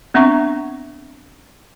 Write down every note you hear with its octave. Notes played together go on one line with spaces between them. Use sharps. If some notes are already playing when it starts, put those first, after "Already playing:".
B3 C4 D4 E5 A#5 C#6